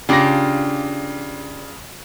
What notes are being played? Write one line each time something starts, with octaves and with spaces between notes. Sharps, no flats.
C#3 D4 F4 G4 A#6